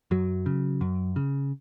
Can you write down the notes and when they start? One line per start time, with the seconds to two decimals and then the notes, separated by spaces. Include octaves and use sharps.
0.11 F#2 F#3
0.46 C#3
0.81 F#2
1.16 C#3